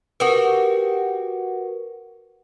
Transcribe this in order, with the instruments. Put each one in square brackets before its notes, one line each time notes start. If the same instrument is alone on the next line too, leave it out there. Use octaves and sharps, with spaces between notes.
[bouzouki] F#4 G4 [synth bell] A#4 B4